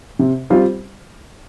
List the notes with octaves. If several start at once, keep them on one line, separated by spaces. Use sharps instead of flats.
C3
G3 C4 F4 C5